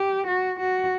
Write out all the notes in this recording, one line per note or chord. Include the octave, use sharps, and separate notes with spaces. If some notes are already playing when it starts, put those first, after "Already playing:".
Already playing: G4
F#4
F#4